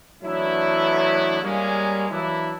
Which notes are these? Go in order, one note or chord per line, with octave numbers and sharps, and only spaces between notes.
E3 F#3 A3 B3 D4 E4
G3 G#3 A#3 C#4
E3 F#3 A#3 D4 E4